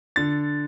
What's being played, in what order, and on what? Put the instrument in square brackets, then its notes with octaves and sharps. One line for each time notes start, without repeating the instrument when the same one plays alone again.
[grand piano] D3 A6